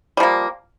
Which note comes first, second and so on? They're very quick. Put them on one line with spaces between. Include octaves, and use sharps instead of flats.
G3 F3 A#3